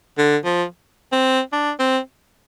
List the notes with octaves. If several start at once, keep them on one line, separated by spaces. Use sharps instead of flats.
D3
F3
C4
D4
C4